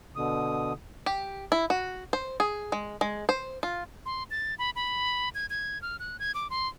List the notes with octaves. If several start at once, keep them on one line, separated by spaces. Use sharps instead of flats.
B2 D3 D#6
G4
E4
F#4
C5
G#4
G#3
G#3
C5
F4
C6
A6
B5
B5
G#6
G#6
F6
F#6
G#6
D6
C6